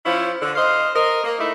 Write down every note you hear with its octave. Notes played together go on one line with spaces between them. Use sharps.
F3 C#4 E4
D3
C5 D#5 F5
A#4 D#5
A#3
A3 D#4 E4